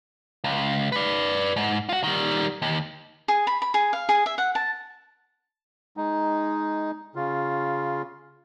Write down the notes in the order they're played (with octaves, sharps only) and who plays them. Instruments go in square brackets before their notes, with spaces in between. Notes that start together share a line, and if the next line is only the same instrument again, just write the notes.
[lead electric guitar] C#2
B4 D5
G#2
F4 F#4
D#3 G3
D#2
[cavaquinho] G#4
B5
B5
G#4
F5
G#4
E5
F#5
A5
[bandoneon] G#3 D#4
C#3 F4